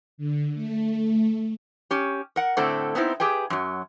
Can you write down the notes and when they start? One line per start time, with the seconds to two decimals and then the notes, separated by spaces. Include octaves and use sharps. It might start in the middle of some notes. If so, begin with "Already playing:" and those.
0.18 D3
0.53 A3
1.91 C#4 G4
2.36 A#4 F#5
2.57 A2 D3 A3 C4 A4
2.95 B3 C4 D#4 E4 C5
3.20 G4 G#4 B4 G5
3.50 F#2 F#3